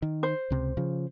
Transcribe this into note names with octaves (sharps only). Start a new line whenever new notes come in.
D#3
C5
C#2 C3
C#3 F3